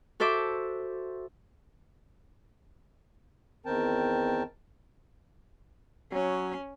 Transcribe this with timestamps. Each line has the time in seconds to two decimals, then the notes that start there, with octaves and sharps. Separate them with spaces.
0.20 F#4 A4 C5 E5 D6
3.66 E2 D#3 C4 A#4 G5 A5
6.12 F#3 C#4